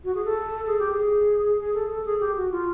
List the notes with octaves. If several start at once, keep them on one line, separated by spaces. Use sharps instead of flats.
F#4
G#4
A4
G#4
G4
G#4
G#4
A4
A4
G#4
G4
F#4
F4